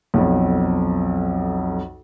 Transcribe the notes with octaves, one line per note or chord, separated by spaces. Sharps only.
B1 F2